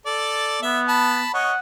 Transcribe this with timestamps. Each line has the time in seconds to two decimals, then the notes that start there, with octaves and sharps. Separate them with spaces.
0.06 A4 D5
0.63 B3 E5
0.88 A5 B5
1.34 C#5 D#5 F#5